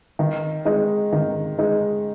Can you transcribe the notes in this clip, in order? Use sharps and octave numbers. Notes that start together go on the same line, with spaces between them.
D#3
G#3 D#4
D#3
G#3 D#4